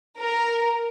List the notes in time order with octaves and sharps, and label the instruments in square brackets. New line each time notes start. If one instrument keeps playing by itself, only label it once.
[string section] A#4